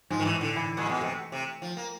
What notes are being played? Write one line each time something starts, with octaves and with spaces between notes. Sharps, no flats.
G#2 F3 G#3
D#3
A2 E3 A3
D3
E3 E4
A#2 G#3 G#4
B2
C3 A3 A4
C3
F3
A#3